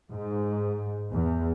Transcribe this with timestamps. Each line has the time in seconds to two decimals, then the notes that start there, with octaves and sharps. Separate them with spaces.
0.12 G#2
1.12 E2